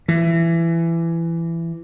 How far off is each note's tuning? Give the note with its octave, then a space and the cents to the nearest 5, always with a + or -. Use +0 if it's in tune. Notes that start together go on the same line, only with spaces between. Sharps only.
E3 +20